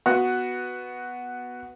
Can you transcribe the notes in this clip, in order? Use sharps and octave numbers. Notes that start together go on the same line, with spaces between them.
B3 F#4